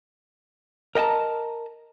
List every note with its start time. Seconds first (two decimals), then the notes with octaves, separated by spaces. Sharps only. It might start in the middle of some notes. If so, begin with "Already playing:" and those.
0.95 A#4 D#5 G5 A5 A#5